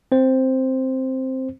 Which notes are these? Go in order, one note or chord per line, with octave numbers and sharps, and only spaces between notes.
C4 C5